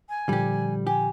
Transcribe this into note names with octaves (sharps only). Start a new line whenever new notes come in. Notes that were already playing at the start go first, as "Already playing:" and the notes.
G#5
A#2 D3 F3 G3 G4
G4 G#5